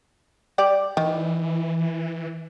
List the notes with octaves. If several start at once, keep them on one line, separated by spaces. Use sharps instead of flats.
G3 G4 D5
D#3 E3